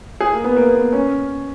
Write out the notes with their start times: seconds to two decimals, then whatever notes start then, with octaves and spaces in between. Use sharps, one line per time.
0.20 G#4
0.33 A#3
0.44 B3
0.56 A#3
0.75 B3
0.93 C#4